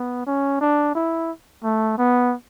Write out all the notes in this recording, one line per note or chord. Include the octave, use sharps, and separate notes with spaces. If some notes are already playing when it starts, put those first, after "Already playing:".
Already playing: B3
C#4
D4
E4
A3
B3